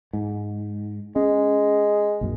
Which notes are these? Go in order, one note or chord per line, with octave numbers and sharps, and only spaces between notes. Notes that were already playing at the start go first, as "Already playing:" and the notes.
G#2
G#3 C#4
A#1 F#2